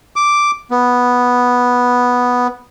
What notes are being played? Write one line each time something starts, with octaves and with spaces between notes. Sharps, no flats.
D6
B3